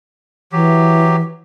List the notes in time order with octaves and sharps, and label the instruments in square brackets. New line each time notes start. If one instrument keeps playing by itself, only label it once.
[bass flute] E3 [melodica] F#3 G4